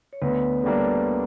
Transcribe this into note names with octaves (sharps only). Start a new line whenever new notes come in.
C#5
D2 B3 B4
D3 G3 A#3 D4